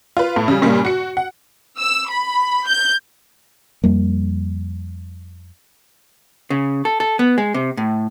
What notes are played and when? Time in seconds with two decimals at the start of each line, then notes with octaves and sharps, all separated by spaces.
0.17 F4 B4
0.36 A2
0.48 C#3 G3
0.62 G2 A#2 C#3 G3 A#3
0.85 F#4 C#7
1.17 F#5
1.78 E6
2.08 B5
2.67 G6
3.84 F2 G3 A#3
6.50 C#3
6.85 A4
7.00 A4
7.19 B3
7.38 G#3
7.54 C3
7.77 A2